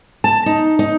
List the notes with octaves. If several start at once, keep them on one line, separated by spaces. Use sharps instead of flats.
A5
D#4
D#4